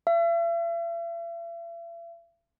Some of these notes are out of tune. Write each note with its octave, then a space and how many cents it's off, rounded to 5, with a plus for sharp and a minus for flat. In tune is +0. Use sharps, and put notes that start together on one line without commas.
E5 +45